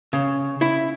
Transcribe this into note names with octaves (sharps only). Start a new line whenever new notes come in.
C#3
E4